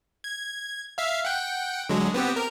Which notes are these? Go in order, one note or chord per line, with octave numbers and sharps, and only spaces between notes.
G#6
E5 F5
F#5 G5
D3 F#3 G#3
B3 C4 G4
A#4